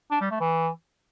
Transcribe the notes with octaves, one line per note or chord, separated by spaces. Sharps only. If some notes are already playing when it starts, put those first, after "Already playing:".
D4
G3
A3
E3